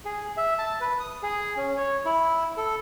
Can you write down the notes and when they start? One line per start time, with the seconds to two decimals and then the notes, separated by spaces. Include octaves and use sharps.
0.05 G#4
0.37 E5
0.59 A5
0.81 B4
1.00 D#6
1.23 G#4
1.57 C#4
1.77 C#5
2.05 E4
2.57 A4